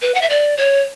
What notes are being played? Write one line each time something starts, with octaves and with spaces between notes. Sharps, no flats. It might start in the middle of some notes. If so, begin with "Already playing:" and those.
B4
F#5
E5
D5
C#5